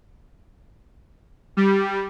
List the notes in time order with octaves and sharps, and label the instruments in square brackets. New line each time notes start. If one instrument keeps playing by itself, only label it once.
[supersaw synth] G3